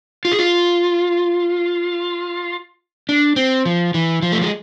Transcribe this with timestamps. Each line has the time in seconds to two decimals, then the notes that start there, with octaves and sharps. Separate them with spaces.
0.25 F4
0.32 G#4
0.39 F4
3.09 D4
3.36 C4
3.65 F3
3.94 E3
4.22 F3
4.32 A3
4.42 G#3